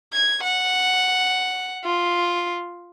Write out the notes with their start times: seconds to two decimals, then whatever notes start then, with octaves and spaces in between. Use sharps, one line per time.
0.13 G#6
0.43 F#5
1.84 F4